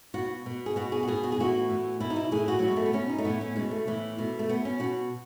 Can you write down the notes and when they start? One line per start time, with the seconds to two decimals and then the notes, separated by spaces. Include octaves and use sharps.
0.14 B2 F#4
0.46 B2
0.66 G#4
0.76 B2 F#4
0.92 G#4
1.03 F#4
1.08 B2 G#4
1.23 F#4
1.32 G#4
1.38 A2 E3 F#4
1.70 A2 E3
2.00 B2 E4
2.10 D#4
2.16 E4
2.31 A2 E3 G#4
2.48 F#4
2.59 B2 F#3
2.68 G#3
2.76 A3
2.85 B3
2.93 B2 C#4
3.09 D#4
3.18 A3
3.25 A2 E3 B3
3.41 C#4
3.56 B2 G#3
3.71 A3
3.87 A2 E3
4.18 B2
4.39 A3
4.49 B2 B3
4.65 C#4
4.80 B2 F#4